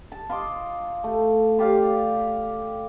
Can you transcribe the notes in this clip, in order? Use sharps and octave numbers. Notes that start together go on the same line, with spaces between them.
A5
F4 D#5 C6 D6
A3
F4 G4 D5 F5